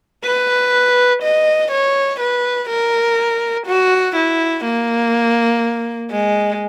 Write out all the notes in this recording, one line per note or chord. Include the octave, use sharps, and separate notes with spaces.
B4
D#5
C#5
B4
A#4
F#4
E4
A#3
G#3